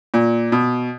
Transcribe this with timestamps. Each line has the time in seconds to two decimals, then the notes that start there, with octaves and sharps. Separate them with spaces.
0.14 A#2
0.52 B2